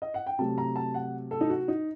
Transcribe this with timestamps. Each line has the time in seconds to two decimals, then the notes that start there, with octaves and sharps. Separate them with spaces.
0.02 D#5
0.14 F#5
0.27 G5
0.39 C3 F#3 A3 A5
0.58 A#5
0.76 A5
0.94 F#5
1.31 A4
1.41 D#4
1.49 F#4
1.68 D#4